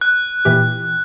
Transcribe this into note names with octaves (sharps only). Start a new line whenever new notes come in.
F#6
A#2 E3 G4